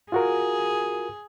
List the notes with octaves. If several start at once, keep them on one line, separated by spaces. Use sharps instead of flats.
F4 F#4 G#4 A#4